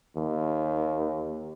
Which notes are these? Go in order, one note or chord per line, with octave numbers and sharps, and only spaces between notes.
D#2